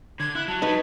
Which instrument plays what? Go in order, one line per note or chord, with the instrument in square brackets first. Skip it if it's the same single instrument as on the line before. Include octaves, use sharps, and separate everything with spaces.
[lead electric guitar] D3 [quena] G#6
[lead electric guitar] E4 [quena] F#6
[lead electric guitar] F#3 [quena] A5
[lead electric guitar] F#3 [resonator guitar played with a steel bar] D#4 B4